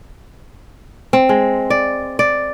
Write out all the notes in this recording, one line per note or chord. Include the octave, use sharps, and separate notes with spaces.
C4
G#3
D5
D5